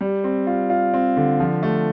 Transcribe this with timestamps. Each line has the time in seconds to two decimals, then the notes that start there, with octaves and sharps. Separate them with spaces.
0.01 G3
0.24 C4
0.47 F4
0.70 F4
0.94 C4
1.17 D3
1.40 F3
1.63 A3